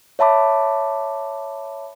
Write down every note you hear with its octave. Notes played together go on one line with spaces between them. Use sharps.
C#5 E5 A5 B5 D6